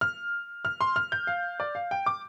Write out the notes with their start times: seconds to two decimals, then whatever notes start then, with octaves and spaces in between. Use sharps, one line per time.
0.01 F6
0.65 F6
0.81 C6
0.96 F6
1.12 G6
1.27 F5
1.60 D5
1.75 F5
1.91 G5
2.06 D6